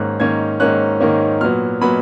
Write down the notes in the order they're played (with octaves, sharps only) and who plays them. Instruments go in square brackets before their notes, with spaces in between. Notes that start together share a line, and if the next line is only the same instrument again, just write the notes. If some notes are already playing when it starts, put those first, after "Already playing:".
Already playing: [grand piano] G#2 D#3 A#3 C#4 F#6
G#2 D#3 A#3 C#4 G#6
G#2 D#3 A#3 C#4 F#6
G#2 D#3 A#3 C#4
A#2 F#3 B3 F6
A#2 F#3 B3 B5